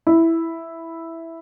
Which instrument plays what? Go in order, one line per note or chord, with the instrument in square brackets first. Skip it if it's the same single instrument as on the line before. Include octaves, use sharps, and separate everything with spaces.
[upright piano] E4